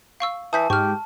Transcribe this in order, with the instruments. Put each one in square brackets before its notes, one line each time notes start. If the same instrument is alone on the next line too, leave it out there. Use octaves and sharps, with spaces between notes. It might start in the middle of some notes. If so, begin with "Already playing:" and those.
[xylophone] F5 C#6 E6
[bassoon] E3 [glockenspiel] A5 [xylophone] D#6 G6 B6
[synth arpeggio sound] G#2 [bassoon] G4 [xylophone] C#6 F6